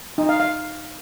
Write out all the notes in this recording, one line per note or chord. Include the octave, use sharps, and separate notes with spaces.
D#4
F5
F5